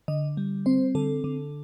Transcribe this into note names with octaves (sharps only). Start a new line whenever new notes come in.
D3 D#5
G3
C4 C5
D3 A4
D3